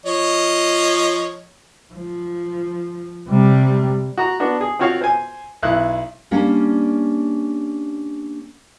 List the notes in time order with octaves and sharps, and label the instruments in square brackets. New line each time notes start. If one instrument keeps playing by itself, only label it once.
[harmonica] F3 C#5 D#5
[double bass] F3
C3 G3
[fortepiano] F#4 A#5
B3 D4 F#4
G#4
C4 F4 F#4 C#5 F5
C5 G#5
B1 E4 F#6
[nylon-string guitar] G3 A#3 C#4 D4